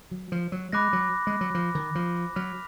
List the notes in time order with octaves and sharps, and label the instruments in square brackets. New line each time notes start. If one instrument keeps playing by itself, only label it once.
[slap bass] F#3
F3
F#3
[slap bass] G#3 [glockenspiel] B5 D6 F#6 A#6
[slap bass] F#3
G#3
F#3
F3
D#3
F3
[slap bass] F#3 [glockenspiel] F6 B6 F7